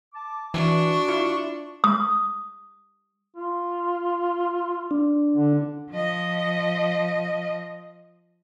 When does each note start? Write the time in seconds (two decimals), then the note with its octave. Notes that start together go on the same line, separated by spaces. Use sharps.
0.13 A5 D6
0.54 E3 D4 F#4 C#6
1.08 E4 F4
1.84 D#6
3.36 F4
4.91 D4
5.36 D3
5.90 F3 D#5